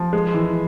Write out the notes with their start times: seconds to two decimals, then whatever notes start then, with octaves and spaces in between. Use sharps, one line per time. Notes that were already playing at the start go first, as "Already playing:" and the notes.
Already playing: F3
0.13 G#3
0.34 E3